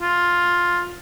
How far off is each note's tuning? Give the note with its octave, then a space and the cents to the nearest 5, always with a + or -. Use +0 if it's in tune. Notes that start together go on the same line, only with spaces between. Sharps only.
F4 +10